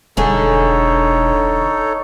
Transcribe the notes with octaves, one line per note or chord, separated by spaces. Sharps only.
E1 D3 D#4 G#4 A4 C#5